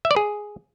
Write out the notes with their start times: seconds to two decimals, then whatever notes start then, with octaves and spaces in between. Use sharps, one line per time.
0.05 E5
0.11 D5
0.16 G#4